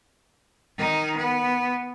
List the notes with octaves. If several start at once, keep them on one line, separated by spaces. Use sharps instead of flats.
D#3 D#4
B3